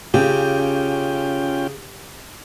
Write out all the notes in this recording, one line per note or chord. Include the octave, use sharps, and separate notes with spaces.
C#3 C#4 F4 G4 G5